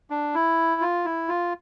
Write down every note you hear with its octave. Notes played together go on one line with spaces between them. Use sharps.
D4
E4
F4
E4
F4